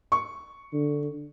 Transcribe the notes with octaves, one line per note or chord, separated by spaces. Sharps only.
C#6
D3